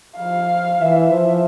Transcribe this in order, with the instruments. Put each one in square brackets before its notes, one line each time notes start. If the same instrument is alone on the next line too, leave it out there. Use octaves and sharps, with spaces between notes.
[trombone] F3 [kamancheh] F5
[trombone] E3 [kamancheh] E5
[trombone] F3